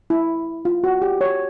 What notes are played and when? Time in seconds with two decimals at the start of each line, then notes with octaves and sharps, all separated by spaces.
0.10 E4
0.65 F4
0.84 F#4
1.02 G4
1.21 C#5